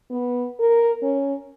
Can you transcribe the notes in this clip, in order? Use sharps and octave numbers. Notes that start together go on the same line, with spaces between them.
B3
A#4
C#4